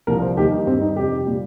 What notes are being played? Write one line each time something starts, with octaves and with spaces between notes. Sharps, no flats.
C2 A#2 F3 A#4
C5
D#2 D#3 G3 G4
D#4
G2 G3 C4
D#4
F2 C3 G3 G4
A#2 G3